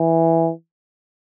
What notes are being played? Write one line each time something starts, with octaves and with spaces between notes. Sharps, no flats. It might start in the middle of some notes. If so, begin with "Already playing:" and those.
Already playing: E3